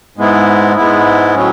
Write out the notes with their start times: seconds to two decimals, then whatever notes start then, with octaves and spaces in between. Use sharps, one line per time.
0.17 G#2 G#3 B3 E4
0.76 G#2 G#3 B3 E4
1.35 A2 F#3 C#4